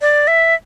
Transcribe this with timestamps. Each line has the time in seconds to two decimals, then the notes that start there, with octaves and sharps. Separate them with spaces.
0.01 D5
0.27 E5